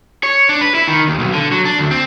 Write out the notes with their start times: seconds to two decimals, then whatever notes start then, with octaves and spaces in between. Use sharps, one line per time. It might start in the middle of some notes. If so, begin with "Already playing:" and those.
0.23 C#5
0.49 D4
0.61 B4
0.75 E4
0.88 D#3
1.08 D#2
1.19 B1
1.33 D3
1.51 F#3
1.65 D4
1.79 D2
1.91 C4